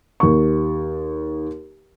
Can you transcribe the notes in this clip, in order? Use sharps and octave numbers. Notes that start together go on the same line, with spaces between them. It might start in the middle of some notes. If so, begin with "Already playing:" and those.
D#2 C#6